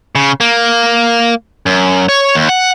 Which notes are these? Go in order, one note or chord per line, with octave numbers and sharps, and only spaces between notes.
C#3
A#3
F#2
C#5
D#2
F#5